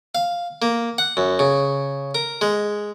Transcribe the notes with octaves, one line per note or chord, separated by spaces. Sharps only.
F5
A#3
F#5
F#2
C#3
A#4
G#3